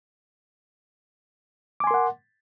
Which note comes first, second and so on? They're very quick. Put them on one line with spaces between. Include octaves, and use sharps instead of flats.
D6 G#5 C6 A#4 F#5